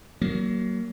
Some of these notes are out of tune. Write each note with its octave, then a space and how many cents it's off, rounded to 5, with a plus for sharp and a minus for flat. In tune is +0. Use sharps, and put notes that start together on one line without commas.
F#3 +30 A#3 +0